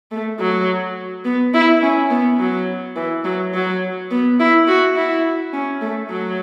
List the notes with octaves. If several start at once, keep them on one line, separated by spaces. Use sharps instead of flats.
A3
F#3
B3
E4
C#4
B3
F#3
E3
F#3
F#3
B3
E4
F#4
E4
C#4
A3
F#3